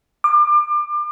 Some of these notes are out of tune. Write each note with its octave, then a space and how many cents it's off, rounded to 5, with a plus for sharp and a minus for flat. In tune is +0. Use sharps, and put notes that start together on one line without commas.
D6 +30